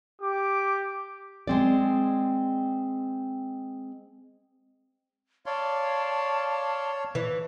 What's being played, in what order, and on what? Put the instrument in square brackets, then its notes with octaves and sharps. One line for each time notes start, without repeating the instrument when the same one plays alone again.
[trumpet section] G4 D6
[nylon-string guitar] G#3 C4 D5
[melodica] C#5 [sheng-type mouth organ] D5 F5 C6 [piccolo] A5
[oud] E3